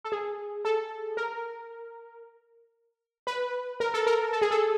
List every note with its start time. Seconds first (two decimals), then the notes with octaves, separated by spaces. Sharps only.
0.04 A4
0.12 G#4
0.65 A4
1.17 A#4
3.27 B4
3.80 A#4
3.94 A4
4.07 A#4
4.33 A4
4.42 G#4
4.51 A4